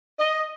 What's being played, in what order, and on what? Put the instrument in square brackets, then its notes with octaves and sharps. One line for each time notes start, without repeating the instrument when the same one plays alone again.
[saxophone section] D#5